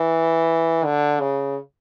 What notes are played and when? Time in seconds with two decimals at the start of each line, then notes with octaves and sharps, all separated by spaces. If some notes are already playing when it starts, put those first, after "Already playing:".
Already playing: E3
0.85 D3
1.20 C#3